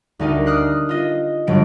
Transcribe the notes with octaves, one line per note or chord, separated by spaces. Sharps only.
D2 A3 D#4 G4 A#4 D#7
D#6 F6 F#6 C7 D7
F4 D#5
G1 F#3 D7